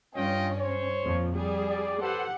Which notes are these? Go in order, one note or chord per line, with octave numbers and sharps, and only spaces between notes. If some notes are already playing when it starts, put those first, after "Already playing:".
G2 C#4 F4 D#5 G5
C5 C#5
F2 A#2 F3
G3 G#4
D5
G4 A4 B4 C5 F#5